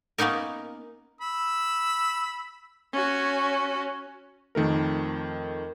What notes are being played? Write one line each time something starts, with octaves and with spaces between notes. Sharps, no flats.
A#3 B3 C#4 D#4 A#4
B5 E6
C#4 F#4
F2 D#3 A3 A#4